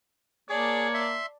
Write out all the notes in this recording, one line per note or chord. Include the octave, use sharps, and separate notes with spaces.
A#3 G#4 C#5 D5 A5
E5 C6